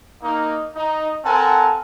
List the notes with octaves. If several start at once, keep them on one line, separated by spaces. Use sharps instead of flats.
A#3 D#4
D#4
C4 A4 A#4 F#5 G#5 A5